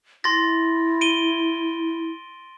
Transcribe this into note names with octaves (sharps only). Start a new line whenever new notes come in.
E4 C6 A6 A#6
D7 D#7 G7